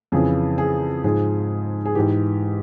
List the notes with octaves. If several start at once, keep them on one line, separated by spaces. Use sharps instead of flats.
F2 C#3 E3 G#4
G#4
G#2 F3 G#4
G#4
G#2 E3 G4